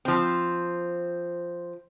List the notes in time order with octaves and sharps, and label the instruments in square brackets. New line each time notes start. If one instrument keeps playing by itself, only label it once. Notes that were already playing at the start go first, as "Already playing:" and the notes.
[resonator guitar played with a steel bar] F3 C4